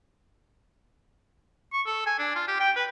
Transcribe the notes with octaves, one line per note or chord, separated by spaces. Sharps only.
C#6
A4
G#5
D4
F4
G4
G5
B4